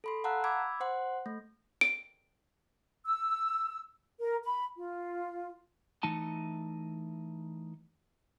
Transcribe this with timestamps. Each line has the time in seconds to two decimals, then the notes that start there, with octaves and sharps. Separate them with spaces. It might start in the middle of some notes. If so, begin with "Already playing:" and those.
0.04 A4 B5 C6
0.24 F5 F#5 A5 A#5 E6 F#6
0.44 B5 D6 E6 G#6 D7
0.80 C5 F#5 C6
1.26 A3
1.81 D7
3.05 E6
4.20 A#4
4.45 B5
4.76 F4
6.03 E3 A3 D#4 A5